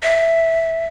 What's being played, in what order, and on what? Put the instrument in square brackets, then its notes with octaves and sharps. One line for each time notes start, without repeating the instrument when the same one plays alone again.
[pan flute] E5